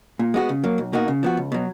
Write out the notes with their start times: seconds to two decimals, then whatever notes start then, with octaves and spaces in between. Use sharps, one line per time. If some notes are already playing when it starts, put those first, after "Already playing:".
0.19 A#2
0.34 G#3 B3 F#4
0.49 C#3
0.64 F#3 A#3
0.78 B1
0.93 B2 A#3 D#4 F#4
1.08 C#3
1.23 F3 B3 F#4
1.37 C#2
1.52 B2 F#3